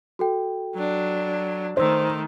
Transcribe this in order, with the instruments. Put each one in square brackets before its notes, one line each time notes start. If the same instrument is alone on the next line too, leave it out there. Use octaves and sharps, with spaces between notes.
[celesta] F#4 A4 G5
[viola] F#3 D4
[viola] D#3 A3 [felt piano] C5 [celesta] C6 E6